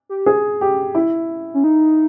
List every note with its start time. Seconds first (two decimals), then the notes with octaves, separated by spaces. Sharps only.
0.09 G4
0.26 G#4
0.61 G4
0.95 E4
1.54 C#4
1.64 D#4